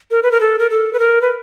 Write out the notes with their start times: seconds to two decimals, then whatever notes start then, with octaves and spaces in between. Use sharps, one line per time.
0.11 A#4
0.23 B4
0.31 A#4
0.41 A4
0.59 A#4
0.70 A4
0.93 B4
0.99 A#4
1.22 B4